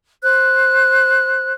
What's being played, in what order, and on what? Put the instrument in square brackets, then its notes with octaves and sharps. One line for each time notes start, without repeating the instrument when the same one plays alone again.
[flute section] C5 F#6